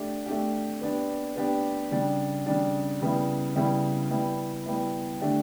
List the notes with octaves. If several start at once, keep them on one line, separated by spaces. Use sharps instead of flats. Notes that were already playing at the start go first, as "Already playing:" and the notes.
Already playing: A3 D4 G4
A3 D4 G4
B3 D4 G4
B3 D4 G4
C#3 G3 D4
C#3 G3 D4
C#3 G3 B3 E4
C#3 G3 B3 E4
G3 B3 E4
G3 B3 E4
D3 A3 D4 G4